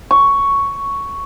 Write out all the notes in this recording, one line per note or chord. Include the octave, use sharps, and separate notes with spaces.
C#6